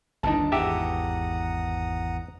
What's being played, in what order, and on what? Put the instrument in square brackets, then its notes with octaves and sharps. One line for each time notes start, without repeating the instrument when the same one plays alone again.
[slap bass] G1 D#2 D4 [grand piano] D#4 A5
[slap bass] G#1 E2 E3 [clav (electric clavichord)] G4 E5 [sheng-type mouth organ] F#5 A#5 D#6